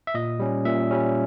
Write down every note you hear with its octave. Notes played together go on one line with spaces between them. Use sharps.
E5
A#2 D#5
G3 C#4
A#2 E5
G3 C#4